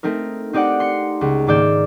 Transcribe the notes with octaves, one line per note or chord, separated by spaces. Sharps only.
A3 C4 D#4 A#4
C4 D#4 G4 D5 F#5
C6 C7 C#7
C#2
G#2 D#3 A#3 D5 E6 G6